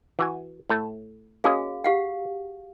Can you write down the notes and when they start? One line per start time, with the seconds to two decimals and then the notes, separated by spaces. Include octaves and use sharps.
0.19 E3 F#4 G#5
0.69 A2 A3
1.44 A#3 C#4 F#4 G#4 D#5 F5
1.84 G4 F5 F#5